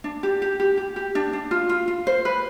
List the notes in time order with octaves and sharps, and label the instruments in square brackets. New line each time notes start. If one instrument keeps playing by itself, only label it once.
[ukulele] D4
G4
G4
G4
G4
G4
D4
D4
F4
F4
F4
C5
B4